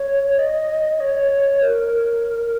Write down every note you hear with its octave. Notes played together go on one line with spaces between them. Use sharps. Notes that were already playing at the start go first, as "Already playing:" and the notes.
Already playing: C#5
D#5
C#5
A#4